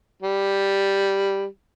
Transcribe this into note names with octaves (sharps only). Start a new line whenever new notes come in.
G3